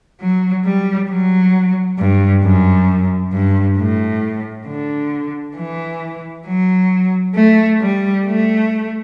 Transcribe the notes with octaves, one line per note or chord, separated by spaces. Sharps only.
F#3
G3
F#3
G2
F#2
G2
A2
D3
E3
F#3
A3
G3
A3